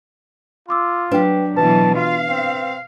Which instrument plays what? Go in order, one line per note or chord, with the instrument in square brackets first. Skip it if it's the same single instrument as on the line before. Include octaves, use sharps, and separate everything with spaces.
[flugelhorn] F4 [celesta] C6 D6 E6
[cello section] F#3 [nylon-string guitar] D4 G4 [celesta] B4 G5
[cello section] B2 E3 F#3 [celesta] B4 [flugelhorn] A5
[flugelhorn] F4 [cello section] F5
[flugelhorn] C4